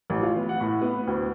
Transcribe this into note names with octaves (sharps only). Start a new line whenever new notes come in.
A1
F4
B3
F#5
A2
B3
D2